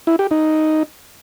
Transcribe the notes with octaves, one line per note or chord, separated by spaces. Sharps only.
E4
G4
D#4